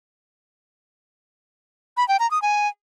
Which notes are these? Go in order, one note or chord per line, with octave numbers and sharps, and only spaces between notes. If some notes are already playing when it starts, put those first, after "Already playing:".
B5
G5
A#5
D#6
G#5